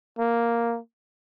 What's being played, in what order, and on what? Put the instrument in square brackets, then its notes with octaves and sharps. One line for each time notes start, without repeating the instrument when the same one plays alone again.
[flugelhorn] A#3